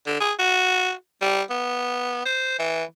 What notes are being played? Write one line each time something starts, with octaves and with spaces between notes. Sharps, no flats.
D3
G#4
F#4
G3
B3
C5
E3